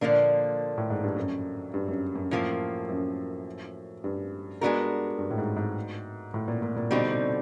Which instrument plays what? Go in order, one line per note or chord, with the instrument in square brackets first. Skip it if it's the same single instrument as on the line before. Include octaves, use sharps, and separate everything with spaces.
[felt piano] A#2 [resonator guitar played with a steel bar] D3 F3 A#3 D4
[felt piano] A2
G#2
G2
F#2
G2
F#2
F#2
[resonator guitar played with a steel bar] A2 F3 A#3
[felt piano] F#2
G2
[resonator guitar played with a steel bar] G#3 B3 D4 F#4 A#4
[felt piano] G2
A2
G#2
G#2
A2
A#2
A#2
A#2
[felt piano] B2 [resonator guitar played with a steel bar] D3 G3 C4 D#4 F#4
[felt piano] C3